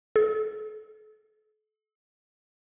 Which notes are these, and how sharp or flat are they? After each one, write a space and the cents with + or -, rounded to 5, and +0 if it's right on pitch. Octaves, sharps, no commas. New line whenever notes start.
A4 -40